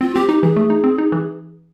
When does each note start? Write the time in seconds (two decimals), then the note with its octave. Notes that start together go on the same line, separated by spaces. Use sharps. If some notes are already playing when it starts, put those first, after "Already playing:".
0.01 C4 F4
0.15 C4 G4
0.29 D#4 G4
0.42 E3 G#4
0.56 A3
0.70 D#4
0.84 C4
0.98 D#4
1.12 E3